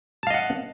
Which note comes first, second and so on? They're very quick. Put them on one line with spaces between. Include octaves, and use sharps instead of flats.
A5 F5 D#5 F#5